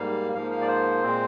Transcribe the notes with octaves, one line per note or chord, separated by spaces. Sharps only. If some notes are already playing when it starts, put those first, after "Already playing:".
Already playing: G#2 G3 A#3 F5
G#2 F3 A#3 F5
F5
D5
C5
A#2 G#3 C4